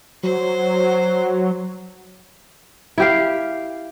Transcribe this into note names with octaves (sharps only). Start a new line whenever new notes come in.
F#3 C5
E4 G4 F5